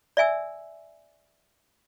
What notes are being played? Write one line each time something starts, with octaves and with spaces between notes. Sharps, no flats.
D5 E5 G#5 E6